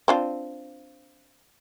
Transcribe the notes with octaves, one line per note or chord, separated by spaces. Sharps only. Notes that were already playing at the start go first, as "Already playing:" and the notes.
C4 D4 F4